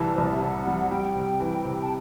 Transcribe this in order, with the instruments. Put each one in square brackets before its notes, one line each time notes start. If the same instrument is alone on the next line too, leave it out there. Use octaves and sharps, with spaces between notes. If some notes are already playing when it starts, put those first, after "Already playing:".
Already playing: [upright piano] C2 C3 E3 G3 [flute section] A5
[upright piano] C2 [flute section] C5
[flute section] D5
E5
[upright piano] C3 [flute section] F#5
[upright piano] G3
[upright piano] G3 [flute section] G5
[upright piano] C3
E3
C3
[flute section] A5